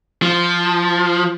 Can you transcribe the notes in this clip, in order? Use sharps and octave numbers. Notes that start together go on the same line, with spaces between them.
F3